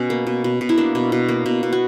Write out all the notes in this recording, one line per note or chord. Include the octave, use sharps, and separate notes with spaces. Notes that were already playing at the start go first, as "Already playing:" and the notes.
Already playing: B2 C#4
A#3
B2
B2
B2
E4
A#3 D4
B2
B2
A#3
B2
B2
F#4